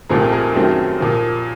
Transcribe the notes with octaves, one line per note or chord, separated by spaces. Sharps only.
C2 A#2 F3 A3 C4 G#4 A#4
G#4 A#4
F#2 D#3 F#3 A3 C4
A#2 F3 A#3